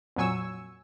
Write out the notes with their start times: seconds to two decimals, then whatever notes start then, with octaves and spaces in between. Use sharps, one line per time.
0.16 F2 A#2 F#3 G#5 C#6 E6